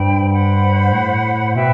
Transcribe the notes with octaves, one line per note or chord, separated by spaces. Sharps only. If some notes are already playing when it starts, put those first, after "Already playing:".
Already playing: G2 C5 G5 B5
C5 F#5 B5
A2
B2 B4 E5 G5